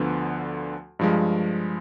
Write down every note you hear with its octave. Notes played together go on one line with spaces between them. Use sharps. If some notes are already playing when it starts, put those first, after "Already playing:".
Already playing: D2 D3 F3 B3
G2 F3 G#3